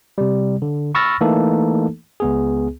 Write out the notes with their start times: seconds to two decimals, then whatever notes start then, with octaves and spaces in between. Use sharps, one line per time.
0.18 C3 G3
0.62 D3
0.95 B5 C#6 E6 F6 A6 A#6
1.21 E3 A3 A#3 D#4 A4
2.20 C#2 B3 G#4